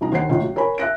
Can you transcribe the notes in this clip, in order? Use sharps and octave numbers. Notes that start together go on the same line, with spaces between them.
C2 D#4 A#5
D#2 C5 F#5 C7
C#2 A2
F#3
A#4 C#5 G#5 B5
E5 F#6 A#6 D7